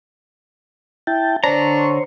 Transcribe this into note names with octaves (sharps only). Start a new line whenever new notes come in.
E4 G5 A5
D3 D4 C5 C#5 A#5